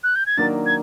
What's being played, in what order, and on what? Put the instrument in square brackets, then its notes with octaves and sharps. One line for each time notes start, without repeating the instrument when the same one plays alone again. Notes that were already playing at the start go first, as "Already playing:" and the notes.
[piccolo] F#6
G6
G#6
[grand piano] D#3 F#3 A#3 D4 [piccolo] A6
[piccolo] G#6